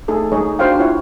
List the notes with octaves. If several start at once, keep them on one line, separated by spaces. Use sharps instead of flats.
A3 D#4 G#4 A4
G#3 D#4 G#4 C#5 D#5
D4 F#4 C5 C#5 F5 G5
E4 F4 C#5 F#5